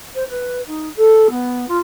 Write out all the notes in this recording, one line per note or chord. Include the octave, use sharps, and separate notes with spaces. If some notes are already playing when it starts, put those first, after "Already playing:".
C5
B4
D#4
A4
B3
F4